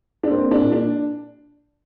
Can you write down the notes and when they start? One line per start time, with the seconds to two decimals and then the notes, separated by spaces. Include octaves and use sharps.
0.23 D4
0.30 A#3 C4
0.51 D4
0.58 A#2
0.72 D4